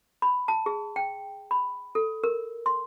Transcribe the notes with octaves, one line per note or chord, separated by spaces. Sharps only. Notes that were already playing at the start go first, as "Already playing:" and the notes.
B5
A5
G#4
G5
B5
A4
A#4
C6